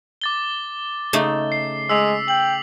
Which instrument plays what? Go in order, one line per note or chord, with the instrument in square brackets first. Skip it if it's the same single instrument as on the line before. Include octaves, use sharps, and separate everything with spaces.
[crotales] D6 A6 G7
[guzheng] C#3 A3 D#4
[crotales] C7
[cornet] G#3 [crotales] E6 B6 F7
[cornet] G5 [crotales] F#7